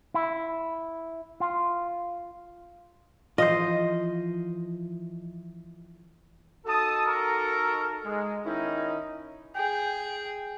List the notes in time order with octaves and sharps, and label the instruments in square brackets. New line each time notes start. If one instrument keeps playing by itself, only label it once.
[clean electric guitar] E4
F4
[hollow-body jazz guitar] E3 F3 F4 [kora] C5 D#5
[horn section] D#4 F#4 A4 [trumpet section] A5 D#6
[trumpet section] A#4 A#5 C#6
G#3
[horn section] D#3 E4 [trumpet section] C#4 D#4
[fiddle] G#4 [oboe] G5